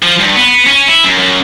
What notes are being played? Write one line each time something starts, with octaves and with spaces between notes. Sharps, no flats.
F3
G2
B3
C#4
E4
F#2
F#2